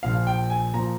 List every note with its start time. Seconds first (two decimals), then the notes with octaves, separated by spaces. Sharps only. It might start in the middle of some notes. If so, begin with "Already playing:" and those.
0.03 A#1 A#2 F3 F5
0.27 G5
0.50 G#5
0.74 A#2 F3 A#5